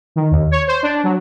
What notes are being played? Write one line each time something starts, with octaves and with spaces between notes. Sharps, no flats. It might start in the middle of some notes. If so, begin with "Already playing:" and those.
D#3
D#2
C#5
C5
D4
F#3